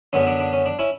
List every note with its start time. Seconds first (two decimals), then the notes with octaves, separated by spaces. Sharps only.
0.13 F#2 D3 F#3 B3 C#4
0.27 D4
0.40 D4
0.53 C#4
0.66 D4
0.79 C#4 E4